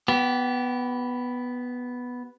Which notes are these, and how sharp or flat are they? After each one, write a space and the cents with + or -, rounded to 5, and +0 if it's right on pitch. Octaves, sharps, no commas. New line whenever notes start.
B3 +0 G4 -25